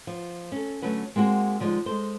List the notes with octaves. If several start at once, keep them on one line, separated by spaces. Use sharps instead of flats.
F3
C#4 A4
D3 F#3 A3 C#4 B4
G#3 A#3 C4 F#4 G#4
D3 F3 G3 G#3 D#4
G#3 A4 C5